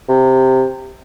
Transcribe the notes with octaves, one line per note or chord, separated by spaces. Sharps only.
C3